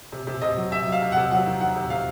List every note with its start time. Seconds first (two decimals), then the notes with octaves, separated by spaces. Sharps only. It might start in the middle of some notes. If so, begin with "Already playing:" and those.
0.12 C3
0.27 C3
0.42 C3 D#5
0.56 F#3
0.71 C3 E5
0.87 F#3
0.92 F5
1.02 C3
1.12 C3 F#5
1.31 F#3 F#5
1.46 D#3
1.60 D#3 F#5
1.76 C3
1.90 C3 F5